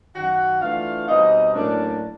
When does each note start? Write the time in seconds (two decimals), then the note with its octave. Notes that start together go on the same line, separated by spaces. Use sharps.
0.15 F#2 D#3 F#3 F#4 F#5
0.61 E3 A3 D4 F4 F5
1.08 B2 G3 C4 D#4 D#5
1.54 A2 F#3 A#3 C#4 D4 D5